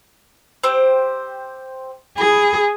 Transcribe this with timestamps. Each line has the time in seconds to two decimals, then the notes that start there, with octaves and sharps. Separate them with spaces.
0.63 C4 G4 C5
2.18 E4 G#4